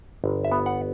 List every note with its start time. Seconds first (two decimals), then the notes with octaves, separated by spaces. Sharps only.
0.24 G1
0.45 E5
0.52 B3
0.66 F#5